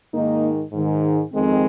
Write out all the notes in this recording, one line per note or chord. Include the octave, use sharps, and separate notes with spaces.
G#2 D#3 A#3 D#4
G#2 D#3
F2 D#3 G#3 C4